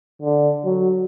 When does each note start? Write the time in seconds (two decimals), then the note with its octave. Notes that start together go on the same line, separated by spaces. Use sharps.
0.22 D3
0.65 F#3